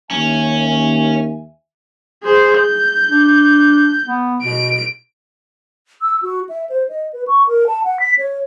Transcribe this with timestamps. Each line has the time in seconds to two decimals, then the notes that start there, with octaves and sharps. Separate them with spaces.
0.11 D#2 C#4 E5 G#5
2.23 G#4 C5
2.59 G6
3.09 D4
4.06 B3
4.42 B2 D7
6.02 E6
6.22 F#4
6.49 E5
6.69 C5
6.89 D#5
7.13 B4
7.28 C#6
7.47 A#4
7.67 A5
7.84 F#5
8.00 B6
8.18 C#5